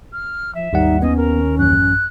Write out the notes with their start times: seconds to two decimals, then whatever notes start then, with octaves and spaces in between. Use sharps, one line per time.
0.13 F6
0.55 F3 E5
0.73 G#1 D#2 G3 D#4 F#5
1.02 B3 C#4 D#5
1.17 A#4
1.59 A1 F#2 F#6